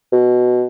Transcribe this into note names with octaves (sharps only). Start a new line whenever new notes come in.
B2